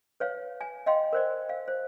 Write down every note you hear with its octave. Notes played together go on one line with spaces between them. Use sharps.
B4 C#5 F5
G#5
D#5 F5 G5 C6
A#4 C5 D5
F5
C5